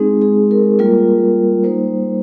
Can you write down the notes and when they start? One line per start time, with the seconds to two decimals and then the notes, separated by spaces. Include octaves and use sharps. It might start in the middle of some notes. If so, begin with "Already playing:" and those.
Already playing: G#3 C4 D#4 G#4
0.22 G#4
0.51 A#4
0.79 G3 A#3 F4 A#4
1.64 G3 A#3 D#4 C5